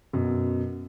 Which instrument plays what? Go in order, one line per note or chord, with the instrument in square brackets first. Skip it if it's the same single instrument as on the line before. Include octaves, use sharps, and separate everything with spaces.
[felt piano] F#2 B2